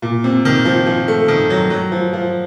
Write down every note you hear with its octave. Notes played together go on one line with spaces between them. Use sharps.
A#2
C3
D#3
F3
F3
A3
D#3
F#3
F#3
F3
F3